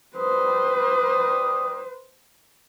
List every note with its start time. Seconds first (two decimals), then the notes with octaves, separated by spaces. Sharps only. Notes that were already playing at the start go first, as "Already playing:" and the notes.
0.17 G3 B4 C5 D#6